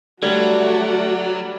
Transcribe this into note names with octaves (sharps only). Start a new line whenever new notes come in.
D3 F#3 G3 A3 F#4 D5 G#6